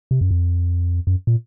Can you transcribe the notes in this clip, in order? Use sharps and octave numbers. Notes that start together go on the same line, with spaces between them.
C3
F#2
F2
F#2
A#2